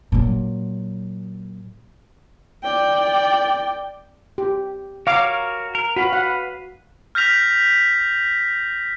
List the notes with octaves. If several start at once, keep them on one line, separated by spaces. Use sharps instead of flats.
A#2 F#3
D5 G5
G4
F#4 A#4 C#5 F5 D6
A#4
F#4 B4 F5 B5
F#5
F6 G6 A#6 B6 F7